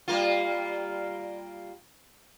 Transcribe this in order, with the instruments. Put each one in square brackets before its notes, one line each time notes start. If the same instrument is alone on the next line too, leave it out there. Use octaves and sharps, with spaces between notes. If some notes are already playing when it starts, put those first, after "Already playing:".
[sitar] G3 A#3 F4